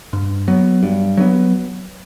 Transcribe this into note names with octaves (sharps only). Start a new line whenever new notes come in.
G2
F#3 B3
G2
F#3 B3